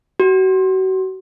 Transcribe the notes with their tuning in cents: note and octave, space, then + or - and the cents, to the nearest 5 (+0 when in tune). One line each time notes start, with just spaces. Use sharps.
F#4 +35